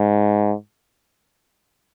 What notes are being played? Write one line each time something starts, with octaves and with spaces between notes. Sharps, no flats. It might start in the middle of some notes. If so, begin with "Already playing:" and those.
Already playing: G#2